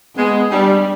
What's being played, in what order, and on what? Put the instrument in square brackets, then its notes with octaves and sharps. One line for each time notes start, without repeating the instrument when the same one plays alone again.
[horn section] G#3 [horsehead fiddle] B3
[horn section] G3 [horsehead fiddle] D4